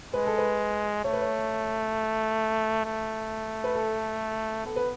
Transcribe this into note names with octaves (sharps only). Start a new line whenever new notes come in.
G#3 B4
A4
B4
A3 C#5
B4
C#5
A3
B4
A4
B3 A4
B4